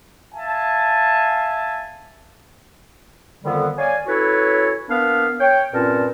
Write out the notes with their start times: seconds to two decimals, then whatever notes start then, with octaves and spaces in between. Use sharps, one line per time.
0.35 E5 F5 G#5 A5
3.43 F2 D3 D#3 G3 B3
3.77 C#5 D5 F5 G#5
4.07 C#4 E4 F#4 A4 B4 C#5
4.89 A#3 B3 D4 B4 F5
5.39 C#5 G5
5.72 G2 A#2 C4 C#4 A#4 A5